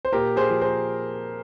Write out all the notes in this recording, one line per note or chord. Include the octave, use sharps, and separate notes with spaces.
C5
A#2 G4 A#4
G#4 C5
F3
G#4 C5